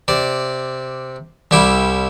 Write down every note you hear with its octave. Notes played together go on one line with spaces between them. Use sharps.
C3 D5
C2 G3 E4 D6